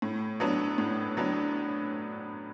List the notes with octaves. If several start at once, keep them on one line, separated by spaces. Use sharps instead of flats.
A2
F#3 B3 D4
A2
F#3 B3 D4